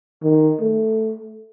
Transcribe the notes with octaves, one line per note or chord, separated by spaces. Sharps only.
D#3
A3